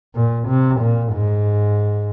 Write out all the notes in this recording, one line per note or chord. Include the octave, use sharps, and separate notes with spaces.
A#2
C3
A#2
G#2